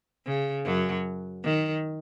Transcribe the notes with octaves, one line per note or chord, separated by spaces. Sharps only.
C#3
F#2 F#3
D#3